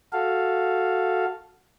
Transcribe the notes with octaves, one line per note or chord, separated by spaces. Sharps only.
F#4 A4 F5